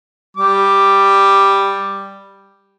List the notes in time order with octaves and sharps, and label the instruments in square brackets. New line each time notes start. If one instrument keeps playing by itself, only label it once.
[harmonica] G3 D6